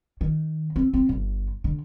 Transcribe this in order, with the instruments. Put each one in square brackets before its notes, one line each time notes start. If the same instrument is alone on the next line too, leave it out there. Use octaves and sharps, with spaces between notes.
[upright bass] D#3
C4
C4
G1
D3